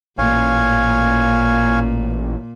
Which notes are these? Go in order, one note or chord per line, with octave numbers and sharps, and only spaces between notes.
A1 A#2 C#5 F5 G#5